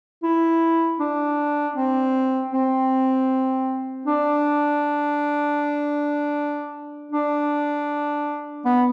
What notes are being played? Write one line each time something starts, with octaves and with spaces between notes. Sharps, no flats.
E4
D4
C4
C4
D4
D4
B3